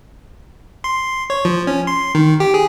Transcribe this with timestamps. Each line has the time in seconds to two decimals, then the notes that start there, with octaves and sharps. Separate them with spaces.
0.84 C6
1.30 C#5
1.45 F3
1.67 C#4
1.87 C6
2.15 D#3
2.40 G4
2.54 G#4